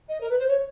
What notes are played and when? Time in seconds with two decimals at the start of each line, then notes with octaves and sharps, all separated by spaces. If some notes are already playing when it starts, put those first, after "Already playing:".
0.09 D#5
0.21 A#4
0.29 B4
0.39 C5
0.48 C#5